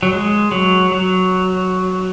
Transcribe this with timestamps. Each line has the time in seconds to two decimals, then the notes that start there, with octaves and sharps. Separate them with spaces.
0.03 F#3
0.13 G#3
0.51 F#3
0.92 F#3